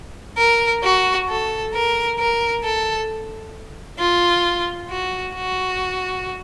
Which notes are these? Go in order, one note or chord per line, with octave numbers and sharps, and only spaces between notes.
A#4
F#4
A4
A#4
A#4
A4
F4
F#4
F#4